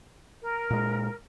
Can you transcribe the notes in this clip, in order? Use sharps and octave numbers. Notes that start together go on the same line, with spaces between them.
A#4
A#2 G#3